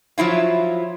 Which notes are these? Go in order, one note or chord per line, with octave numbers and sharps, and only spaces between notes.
F3 F#3 E4 F4